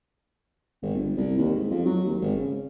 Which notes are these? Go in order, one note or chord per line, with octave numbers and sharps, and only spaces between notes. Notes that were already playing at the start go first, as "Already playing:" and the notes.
G#1
G1
C2
D#2
G#2
F2
F#3
D#2
G#1
C#3